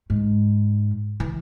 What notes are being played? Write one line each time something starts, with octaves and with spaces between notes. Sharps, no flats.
G#2
E3